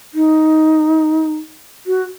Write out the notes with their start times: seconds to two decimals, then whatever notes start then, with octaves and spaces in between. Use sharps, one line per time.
0.14 D#4
1.87 F#4